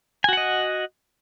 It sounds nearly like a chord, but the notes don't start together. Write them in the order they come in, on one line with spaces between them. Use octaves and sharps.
G#5 F#4 F#5 D#5